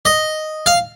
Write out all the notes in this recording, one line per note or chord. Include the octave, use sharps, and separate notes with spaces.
D#5
F5